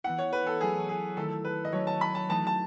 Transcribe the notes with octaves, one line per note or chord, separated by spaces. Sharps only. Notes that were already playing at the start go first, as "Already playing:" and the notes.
E3 B3 E4 F#5
C#5
B4
A4
F#3 A3 E4 G#4
G#4
D#3 A3 E4 A4
B4
D#5
F#3 A3 C#4 C#5
A5
B5
A5
E3 A3 D#4 A5
A5